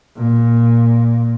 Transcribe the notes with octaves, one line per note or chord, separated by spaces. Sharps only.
A#2